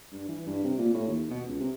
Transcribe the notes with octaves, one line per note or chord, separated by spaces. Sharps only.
G2
E3
G2
C3
A#2
A2
D#2
B2
C#2
C3